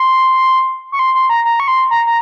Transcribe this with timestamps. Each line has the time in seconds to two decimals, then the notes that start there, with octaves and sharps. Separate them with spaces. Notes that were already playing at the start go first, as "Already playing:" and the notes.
Already playing: C6
0.92 C#6
0.99 C6
1.15 C6
1.30 A#5
1.45 A#5
1.60 C#6
1.68 C6
1.91 A#5
2.06 A#5